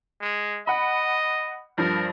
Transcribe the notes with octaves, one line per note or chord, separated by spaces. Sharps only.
G#3
D#5 F#5 B5
G2 F3 A#4